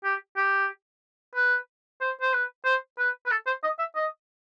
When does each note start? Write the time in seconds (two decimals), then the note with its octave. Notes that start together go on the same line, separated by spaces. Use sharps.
0.04 G4
0.37 G4
1.35 B4
2.01 C5
2.21 C5
2.33 B4
2.65 C5
2.99 B4
3.26 B4
3.31 A4
3.46 C5
3.63 D#5
3.79 E5
3.95 D#5